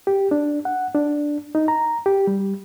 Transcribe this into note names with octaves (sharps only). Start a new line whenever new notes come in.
G4
D4
F#5
D4
D#4
A#5
G4
G3